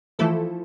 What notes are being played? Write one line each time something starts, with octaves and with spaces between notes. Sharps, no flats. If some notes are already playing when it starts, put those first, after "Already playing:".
E3 F3 A3 E4 A4